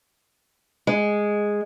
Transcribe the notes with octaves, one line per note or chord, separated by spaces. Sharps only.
G#3